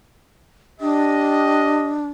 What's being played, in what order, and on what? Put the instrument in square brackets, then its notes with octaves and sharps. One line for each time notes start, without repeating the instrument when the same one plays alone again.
[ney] D4 [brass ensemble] G4 D#5